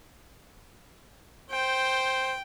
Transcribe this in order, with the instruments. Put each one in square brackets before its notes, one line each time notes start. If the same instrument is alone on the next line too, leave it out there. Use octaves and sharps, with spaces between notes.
[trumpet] C5 [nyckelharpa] G5